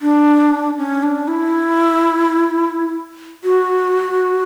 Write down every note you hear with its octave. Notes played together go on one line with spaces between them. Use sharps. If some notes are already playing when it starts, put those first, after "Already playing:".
D4
C#4
D4
E4
F#4